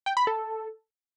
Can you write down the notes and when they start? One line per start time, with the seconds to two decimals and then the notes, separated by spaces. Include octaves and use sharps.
0.06 G5
0.17 B5
0.27 A4